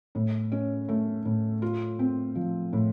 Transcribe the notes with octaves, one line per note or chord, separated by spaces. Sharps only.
A2
C#4
A3
A2
F4
C4
F3
A2